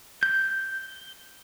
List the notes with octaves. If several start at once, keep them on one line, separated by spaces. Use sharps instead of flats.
G6